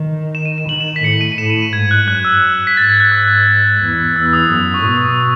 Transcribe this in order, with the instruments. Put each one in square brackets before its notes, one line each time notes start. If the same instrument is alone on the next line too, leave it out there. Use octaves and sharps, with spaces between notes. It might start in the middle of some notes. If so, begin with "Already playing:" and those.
Already playing: [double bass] D#3
[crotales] E7
D#7
E7
[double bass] D#3 [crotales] F#7
[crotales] E7
B6
[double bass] A2 [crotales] C#7
[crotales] D#7
D#7
[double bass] A2 [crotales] E7
[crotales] D#7
D#7
[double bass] G#2 [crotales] G#6
[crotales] F#6
[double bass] F#2 [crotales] F#6
[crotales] E6
B6
[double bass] G#2 [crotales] A6
[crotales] G#6
F#6
E6
[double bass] E2
[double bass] E2 [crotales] E6
[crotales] E6
D#6
[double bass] F#2
[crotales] C#6
[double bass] B2 [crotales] D#6
[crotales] D#6
D#6